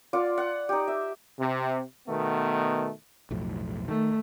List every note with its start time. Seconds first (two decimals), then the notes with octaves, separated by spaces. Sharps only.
0.13 F4 D5 F#5
0.38 F#5
0.69 D#4 G4
0.88 E5
1.39 C3
2.08 B2 D#3 A3 B3
3.31 B1 F2 A2
3.88 D#3 A3